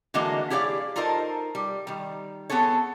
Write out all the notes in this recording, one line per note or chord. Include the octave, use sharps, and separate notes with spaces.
D3 E3 G#3 A#3 F#4 D#5
E4 G4 G#4 C#5 D5 F5
D#4 F4 A4 A#4 C5 D#5
G3
D#3 G3
B3 C4 G#4 A4 C#5